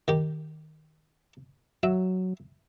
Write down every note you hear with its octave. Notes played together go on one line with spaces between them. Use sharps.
D#3 G4
F#3 E5